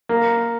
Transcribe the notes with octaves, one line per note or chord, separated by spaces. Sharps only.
A#3